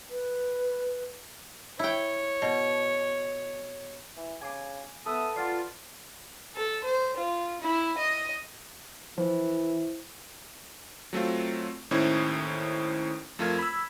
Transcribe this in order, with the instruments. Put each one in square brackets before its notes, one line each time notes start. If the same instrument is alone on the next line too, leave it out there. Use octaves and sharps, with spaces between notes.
[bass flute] B4
[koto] E4 G5 [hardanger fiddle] C#5
[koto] B2
[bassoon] E3
[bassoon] C#3 [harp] G#5 D6 C7
[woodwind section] B3 E5 D#6 [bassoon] A4 [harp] B4 [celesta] E6
[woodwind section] F4 [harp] D5 A6 [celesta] F#5 F6 C7
[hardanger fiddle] A4
C5
F4
E4
D#5
[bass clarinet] E3 [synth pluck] F3 [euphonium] E4 [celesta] C5
[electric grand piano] F#3 A3 C4 F4
D#2 A2 C#4 D#4 E4 C5
F2 A3 F4 A#4 G#6
B5 E6